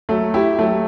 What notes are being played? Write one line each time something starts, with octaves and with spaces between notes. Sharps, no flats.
F#3 A3
E4 G4
F#3 A3